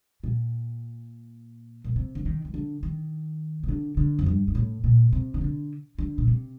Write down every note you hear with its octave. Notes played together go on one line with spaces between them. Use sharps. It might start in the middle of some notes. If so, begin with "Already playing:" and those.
A#2
A#2
C3
D3
D#3
D#3
D3
D#3
C3
D3
D3
F2
G2
G2
A2
A#2
C3
D#3
D3
D3
A#2
C3